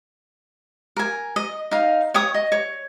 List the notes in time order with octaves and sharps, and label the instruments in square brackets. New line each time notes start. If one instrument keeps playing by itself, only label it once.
[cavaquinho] A#4 G#5
D#5
D#4 F5
C#5 G5 C#6 D#6
D#5
C#5